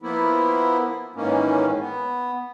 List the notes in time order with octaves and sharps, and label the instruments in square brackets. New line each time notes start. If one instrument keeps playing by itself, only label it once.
[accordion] F3 A#3 B3 E4
G#2 D#3 E3 A#3 C#4
B3